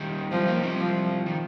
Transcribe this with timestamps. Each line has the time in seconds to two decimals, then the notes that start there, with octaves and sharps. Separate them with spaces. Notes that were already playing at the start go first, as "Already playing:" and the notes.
Already playing: D#3 G3
0.31 F3 G3 C4
0.47 A#3 D#4
0.62 G3 C4
0.79 F3
1.26 D#3